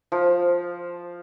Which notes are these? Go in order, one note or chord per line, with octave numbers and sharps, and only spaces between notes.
F3